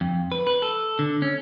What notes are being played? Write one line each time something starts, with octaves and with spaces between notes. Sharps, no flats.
F2
B4
B4
A4
D3
C#4